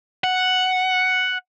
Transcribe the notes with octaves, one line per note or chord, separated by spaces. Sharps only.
F#5